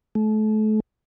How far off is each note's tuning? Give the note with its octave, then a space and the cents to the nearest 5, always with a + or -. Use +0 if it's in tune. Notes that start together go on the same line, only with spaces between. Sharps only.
A3 -35